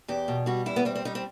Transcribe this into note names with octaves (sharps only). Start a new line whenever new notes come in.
E2 G4
B2
G3 F#4
E2 E4
B3
G3 C4
C4
G3 D#4
C4